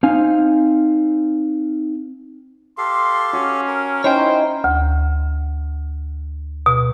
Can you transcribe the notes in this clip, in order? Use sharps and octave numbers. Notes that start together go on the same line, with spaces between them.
C4 D#4 F5 G#5
G4 A4 F5 C6
C#4 F#4
A#4
C#4 D#4 E4 C5 C#5 G5
D2
B2